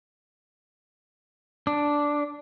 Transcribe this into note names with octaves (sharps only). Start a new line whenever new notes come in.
D4